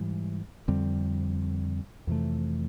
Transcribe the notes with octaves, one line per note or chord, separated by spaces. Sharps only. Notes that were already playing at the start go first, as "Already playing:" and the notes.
Already playing: G#2 E3 G3
F2 D3 G3 C4
F2 C3 E3 A3